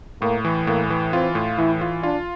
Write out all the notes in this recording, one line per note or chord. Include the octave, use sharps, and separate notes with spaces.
A2 A#3
E3
A2 A#3
E3
C4 F4
A2
E3 E4
F4
D4 F4